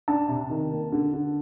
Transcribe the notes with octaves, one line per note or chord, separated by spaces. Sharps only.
D4 A5
C3
D#3
A#3
D3
D3